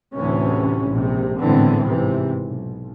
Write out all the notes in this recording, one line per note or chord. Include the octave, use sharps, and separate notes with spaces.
D2 A2 C3 E3 C#4
A#1 G#2 C3
G#1 A2 D3 E3 B3 C4
G#1 C3 E3
B1